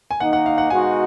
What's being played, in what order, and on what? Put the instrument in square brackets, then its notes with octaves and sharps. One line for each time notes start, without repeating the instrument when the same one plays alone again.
[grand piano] G#5
[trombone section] D#3 A#3 D#4 [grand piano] F#5
[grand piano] F#5
F5
F#5
[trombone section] B2 G#3 D#4 F#4 [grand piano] G#5